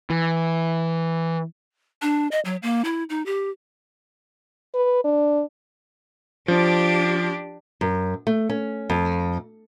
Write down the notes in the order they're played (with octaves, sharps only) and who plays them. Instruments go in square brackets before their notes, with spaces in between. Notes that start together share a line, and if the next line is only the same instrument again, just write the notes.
[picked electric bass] E3
[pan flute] D4
D#5
F#3
A#3
E4
D#4
G4
[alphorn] B4
D4
[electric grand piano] F3 [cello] D4 G4
[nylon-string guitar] F#2
A3
C#4
F2